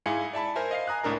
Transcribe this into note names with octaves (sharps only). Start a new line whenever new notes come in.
G#2 E4 G#4 F5 G#5 C#7
D5 E5 A5 B5
A#4 C5 E5 G#5
D#5 F5 C7
G#5 A#5 D#6 F#6
C#2 A2 D4 A#4 A#5